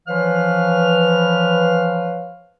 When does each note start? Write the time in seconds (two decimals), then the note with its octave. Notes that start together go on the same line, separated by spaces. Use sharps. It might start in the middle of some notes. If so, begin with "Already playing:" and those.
0.08 E3 F3 B4 C#5 F5 F6